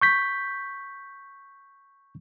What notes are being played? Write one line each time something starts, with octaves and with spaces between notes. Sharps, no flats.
C#6 G6 B6